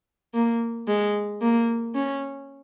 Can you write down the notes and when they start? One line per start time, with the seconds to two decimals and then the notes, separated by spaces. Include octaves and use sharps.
0.34 A#3
0.88 G#3
1.41 A#3
1.95 C#4